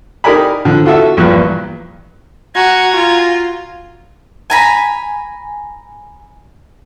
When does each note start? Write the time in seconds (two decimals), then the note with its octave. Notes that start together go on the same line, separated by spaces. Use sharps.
0.24 D#4 G4 A#4 D5 G#5 B5
0.65 D3 F3
0.85 F4 F#4 A4 E5
1.17 A#1 E2 G2 A#2 C#6 F#6
2.55 F#4 G#5 A#5 G#6
2.96 F4
4.50 G#5 A#5 B5